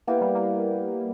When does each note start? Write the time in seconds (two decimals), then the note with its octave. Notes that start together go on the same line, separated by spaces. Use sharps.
0.07 A#3 B3 E4 G4
0.21 G3
0.35 A#3